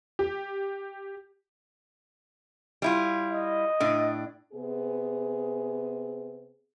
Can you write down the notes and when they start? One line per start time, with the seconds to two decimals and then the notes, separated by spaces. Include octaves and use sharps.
0.19 G4
2.82 G3 E4 F4
3.31 D#5
3.80 A2 D4
4.53 C3 B3 G#4